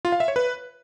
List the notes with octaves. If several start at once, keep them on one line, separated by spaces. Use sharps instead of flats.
F4
F5
E5
C#5
B4